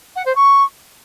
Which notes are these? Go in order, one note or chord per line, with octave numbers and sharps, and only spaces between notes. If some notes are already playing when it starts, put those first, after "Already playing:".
F#5
C5
C#6